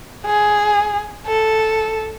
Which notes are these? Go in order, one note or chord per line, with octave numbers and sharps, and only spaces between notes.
G#4
A4